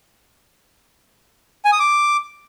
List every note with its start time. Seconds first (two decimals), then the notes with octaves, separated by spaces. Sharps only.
1.65 G#5
1.72 D#6
1.80 D6